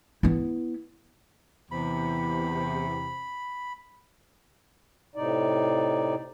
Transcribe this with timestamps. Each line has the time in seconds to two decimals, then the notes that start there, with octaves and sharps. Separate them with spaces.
0.23 B3 E4
1.71 E2 C3 B5
5.15 A2 C3 D#4 D5